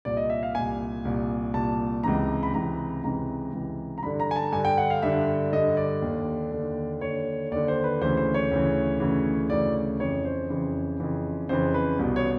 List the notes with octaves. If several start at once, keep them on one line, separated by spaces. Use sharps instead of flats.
C2 A#2 D5
D#5
E5
F5
C2 A#2 G#5
C2 A#2
C2 A#2 A5
C#2 C3 E3 A#5
B5
C#2 C3 E3 A#5
C#2 C3 E3 A#5
C#2 C3 E3
A#5
G2 D3 B5
A#5
G#5
A5
G2 D3 G#5
G5
F#5
F5
G2 D3 E5
G2 D3 D#5
D5
D#2 D3
D#2 D3
D#2 D3 C#5
D#2 D3 D5
C5
B4
D2 C#3 E3 C5
C5
C#5
D2 C#3 E3
D2 C#3 E3
D2 C#3 E3 D5
F2 C#3 E3 C#5
C5
F2 C#3 E3
F2 C#3 E3
F2 C#3 E3 C5
B4
C2 B2
C#5